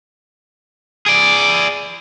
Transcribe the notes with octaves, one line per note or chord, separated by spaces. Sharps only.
G#4 D5